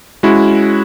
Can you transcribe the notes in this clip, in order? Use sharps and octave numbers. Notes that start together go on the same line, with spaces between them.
G#3 C#4 E4 F#4